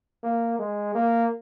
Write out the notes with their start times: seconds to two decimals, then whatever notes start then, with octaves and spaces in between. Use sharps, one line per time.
0.24 A#3
0.59 G#3
0.95 A#3